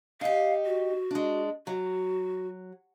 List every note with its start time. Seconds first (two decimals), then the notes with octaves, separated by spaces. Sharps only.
0.21 D#4 G4 F5
0.66 F#4
1.11 G#3 D4
1.67 F#3 F#4